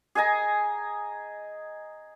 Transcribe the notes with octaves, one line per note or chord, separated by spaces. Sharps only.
G#4 D#5 G#5 A#5